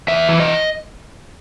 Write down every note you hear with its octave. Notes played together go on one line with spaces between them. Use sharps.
E2 E5
E3
D#5